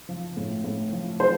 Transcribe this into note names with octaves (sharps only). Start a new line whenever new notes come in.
F3
A2
A2
F3
F3 C5